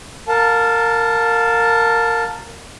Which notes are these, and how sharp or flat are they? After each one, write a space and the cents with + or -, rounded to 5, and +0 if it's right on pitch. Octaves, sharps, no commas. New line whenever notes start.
A#4 -20 F5 +30 A5 +0